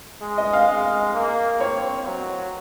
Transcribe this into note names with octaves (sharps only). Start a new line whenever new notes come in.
G#3
D#5
F5
G#3
A#3
C4 C#5
F#3